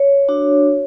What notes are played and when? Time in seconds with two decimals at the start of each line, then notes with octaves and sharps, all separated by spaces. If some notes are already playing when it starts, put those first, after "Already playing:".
Already playing: C#5
0.29 D4 F#4